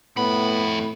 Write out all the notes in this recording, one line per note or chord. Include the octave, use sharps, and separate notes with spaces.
F2 A2 B3 B5